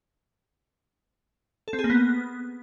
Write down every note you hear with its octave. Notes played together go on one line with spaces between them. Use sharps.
A4
C4
G#4
A#3
B3